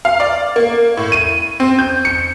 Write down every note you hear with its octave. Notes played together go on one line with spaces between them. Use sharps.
F5
D5
A#3
A2
D#7
C4
G6
C#7